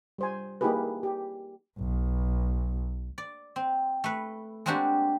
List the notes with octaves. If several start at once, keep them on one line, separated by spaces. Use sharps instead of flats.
G3 C5 G#5
A#3 D#4 E4 G4 G#4 B4
G4
B1
D5
C4
A3 B4
G#3 A#3 C4 D4 F#4 G4